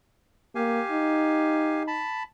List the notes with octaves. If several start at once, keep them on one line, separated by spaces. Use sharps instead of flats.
A#3 G4 F5 G#5
D#4
A5 B5